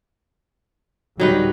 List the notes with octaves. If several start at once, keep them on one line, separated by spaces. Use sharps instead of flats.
D2 A2 F#3 G3 D#4 B4